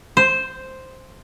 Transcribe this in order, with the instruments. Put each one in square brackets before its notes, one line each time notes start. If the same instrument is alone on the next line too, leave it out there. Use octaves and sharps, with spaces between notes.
[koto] C5